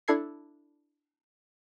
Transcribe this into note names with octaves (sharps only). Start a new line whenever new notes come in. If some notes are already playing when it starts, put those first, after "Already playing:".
D4 E4 A4 G#6 C7